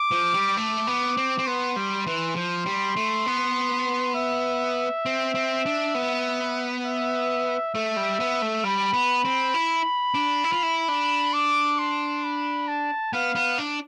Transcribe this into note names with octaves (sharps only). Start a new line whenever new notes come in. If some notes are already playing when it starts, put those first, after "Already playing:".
Already playing: D6
F3
G3
A3 D6
B3
C4
C4
B3 C6
G3
E3
F3 C6
G3
A3
B3
E5
C4
C4
D4
B3
E5
A3 E5
G3
B3
A3
G3 B5
B3
C4
E4
D4
E4
F4
E4
D4
D6
C6
B5
A5
B3 F5
B3
D4